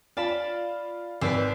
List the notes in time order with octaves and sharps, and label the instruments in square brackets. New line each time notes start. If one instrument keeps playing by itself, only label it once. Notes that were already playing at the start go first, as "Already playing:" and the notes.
[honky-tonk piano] F4 [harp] D5 A5 B5
[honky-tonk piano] G#1 [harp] B4 D5 E6